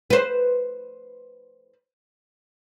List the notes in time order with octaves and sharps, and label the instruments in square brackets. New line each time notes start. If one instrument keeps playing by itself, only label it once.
[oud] B4 C5